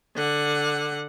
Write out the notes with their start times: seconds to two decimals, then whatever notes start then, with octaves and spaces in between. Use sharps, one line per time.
0.15 D3 F#5